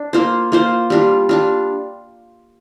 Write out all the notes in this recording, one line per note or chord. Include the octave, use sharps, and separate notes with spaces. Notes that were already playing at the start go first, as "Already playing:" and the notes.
Already playing: D4
A#3 F4 C5
A#3 F4 C5
G3 D4 F4
G3 D4 F4